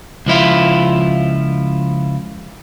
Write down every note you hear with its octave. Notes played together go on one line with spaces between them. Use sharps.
C#2 F3 E4 F4